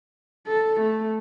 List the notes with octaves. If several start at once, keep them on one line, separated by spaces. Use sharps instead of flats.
A4
A3